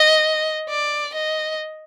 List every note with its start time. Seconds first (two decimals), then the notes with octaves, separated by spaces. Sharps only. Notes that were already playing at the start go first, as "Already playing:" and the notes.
Already playing: D#5
0.69 D5
1.15 D#5